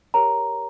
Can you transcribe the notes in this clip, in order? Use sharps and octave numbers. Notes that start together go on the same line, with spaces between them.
G4 A#4 C#5 A#5